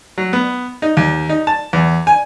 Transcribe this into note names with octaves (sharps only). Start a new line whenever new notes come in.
F#3
B3
D#4
D#2
D#4
A5
E2
G#5